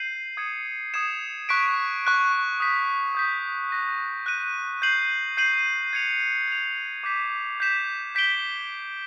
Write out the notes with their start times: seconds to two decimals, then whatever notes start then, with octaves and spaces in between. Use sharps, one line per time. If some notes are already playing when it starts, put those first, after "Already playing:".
Already playing: G6 C7 D#7 F#7
0.37 D#6 G#6 C#7 E7
0.94 D#6 G#6 C#7 E7
1.49 C#6 F#6 B6 D7
2.05 C#6 F#6 B6 D7
2.60 D#6 G6 B6
3.15 D#6 G6 B6
3.71 F#6 A#6 D#7
4.26 F#6 A#6 D#7
4.82 G6 C7 D#7 F#7
5.37 G6 C7 D#7 F#7
5.93 G#6 C#7 F7
6.48 G#6 C#7 F7
7.03 D6 G6 B6 E7
7.59 D6 G6 B6 E7
8.15 G6 B6 D7 G7